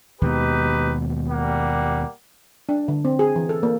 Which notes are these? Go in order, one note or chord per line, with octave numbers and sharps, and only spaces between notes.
D#2 B2 G#3 D#4 G4 B4
G3 A#3 F#5
D4
D3
C4
G#4
E3
A4
A#3